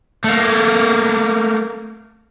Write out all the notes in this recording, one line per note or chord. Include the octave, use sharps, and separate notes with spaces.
A3 A#3